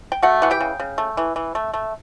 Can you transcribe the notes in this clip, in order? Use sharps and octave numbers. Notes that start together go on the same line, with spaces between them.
G5
A3 F#4 F#5
E3 F#5
G4 G5
C#3
C#3
A3
E3
E3
A3
A3